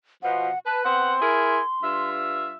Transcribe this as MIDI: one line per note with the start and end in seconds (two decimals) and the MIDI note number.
0.23 0.49 47
0.23 0.49 53
0.23 0.59 78
0.66 0.80 71
0.66 0.83 81
0.85 1.15 59
0.85 1.15 60
0.85 1.15 78
0.85 2.09 84
1.22 1.58 64
1.22 1.58 68
1.22 1.58 70
1.82 2.56 43
1.82 2.56 65
1.82 2.56 76